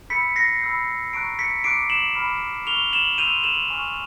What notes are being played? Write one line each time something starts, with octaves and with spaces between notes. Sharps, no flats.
B5 E6 G6 B6 C#7
A#6 C7
B5 E6 G6
A#5 C#6 F#6 C7 D7
B6 C#7
A#5 D6 F#6 C7 D7
E7 F#7
B5 D6 F6
C#6 F6 F7 G7
E7 F#7
C6 E6 G6 D#7 F7
E7 F#7
G#5 C#6 F6